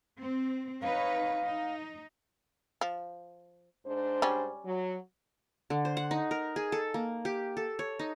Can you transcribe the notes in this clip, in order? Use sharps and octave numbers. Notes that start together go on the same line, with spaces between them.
C4
D#4 B4 C#5 F5
D#4
F3
G#2 D4 C5
G3 C#4
F#3
D3
C5
F#5
D#4
A#4
G#4
A4
A#3
G4
A4
C#5
D#4